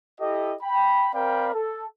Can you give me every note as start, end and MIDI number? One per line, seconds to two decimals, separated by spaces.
0.21 0.55 64
0.21 0.55 67
0.21 0.55 69
0.21 0.55 75
0.63 1.09 79
0.63 1.09 83
1.14 1.51 60
1.14 1.51 70
1.14 1.51 74
1.14 1.51 77
1.14 1.51 79
1.14 1.51 83
1.55 1.85 69